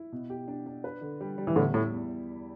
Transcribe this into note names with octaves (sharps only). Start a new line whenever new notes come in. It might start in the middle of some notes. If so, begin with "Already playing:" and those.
Already playing: E4
B2
G4
D4
D4
B4
D3
G3
G3
E3
E2 A2 D3
A2 E4
E2